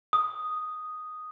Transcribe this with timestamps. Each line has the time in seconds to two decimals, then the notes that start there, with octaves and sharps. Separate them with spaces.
0.13 D#6